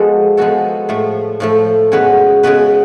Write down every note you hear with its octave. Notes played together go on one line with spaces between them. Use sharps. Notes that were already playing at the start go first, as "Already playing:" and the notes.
Already playing: F3 G#3 B3 F#4 A4
F3 G#3 B3 F#4 A4
A2 F3 A3
A2 F3 A3
C#3 G#3 B3 F#4 B4
C#3 G#3 B3 F#4 B4